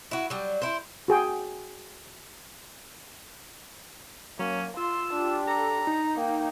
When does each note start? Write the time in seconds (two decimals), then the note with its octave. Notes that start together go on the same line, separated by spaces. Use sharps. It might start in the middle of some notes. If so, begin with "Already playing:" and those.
0.11 E4 F#4
0.30 F#3 G3
0.62 E4 C5
1.08 F#4 G#4 G5
4.39 F#3 A#3 C#4
4.77 F4 C6 E6
5.14 D4 G4
5.47 A4 A#5
5.87 D#4
6.16 A#3 G5